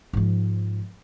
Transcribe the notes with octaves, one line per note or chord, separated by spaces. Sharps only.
G#2 F3